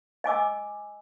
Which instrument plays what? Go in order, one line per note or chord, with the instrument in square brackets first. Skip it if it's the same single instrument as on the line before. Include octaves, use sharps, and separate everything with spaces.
[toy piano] D#5 G#5 D6 E6